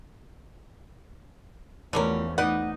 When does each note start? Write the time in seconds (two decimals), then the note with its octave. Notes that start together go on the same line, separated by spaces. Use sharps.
1.93 E2 D3 E3 F3 G3 A3 C#4 A#4
2.38 D#4 B4 D5 F#5